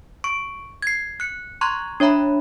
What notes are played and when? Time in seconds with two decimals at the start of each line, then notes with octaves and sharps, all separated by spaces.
0.24 C#6 D7
0.82 G#6 C7
1.20 F#6 C#7
1.61 A#5 C6 C#6 F#6 G#6
2.00 D4 C#5 E5 A#5 B5